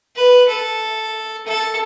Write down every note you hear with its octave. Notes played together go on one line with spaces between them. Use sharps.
B4
A4
A4